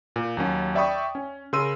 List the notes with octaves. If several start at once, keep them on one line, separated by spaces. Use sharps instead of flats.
A#2
D#2 F#3 C#4
D5 E5 G5 B5 C#6 D#6
C#4
C#3 A#4 C6 E6 D#7